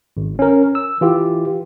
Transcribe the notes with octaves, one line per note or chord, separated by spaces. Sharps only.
G#1
C#4 A#4
E6
E3 F4 G4